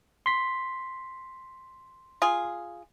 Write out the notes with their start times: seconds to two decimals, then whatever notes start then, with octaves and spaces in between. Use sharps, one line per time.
0.26 C6 B6
2.22 F4 G#4